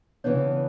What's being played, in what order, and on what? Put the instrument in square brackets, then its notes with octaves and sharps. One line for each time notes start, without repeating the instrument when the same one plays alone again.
[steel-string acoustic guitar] C#3 E3 B3 D4 [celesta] C#5